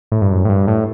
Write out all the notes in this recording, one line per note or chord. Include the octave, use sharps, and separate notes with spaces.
A2
G2
F#2
A2
G2
A2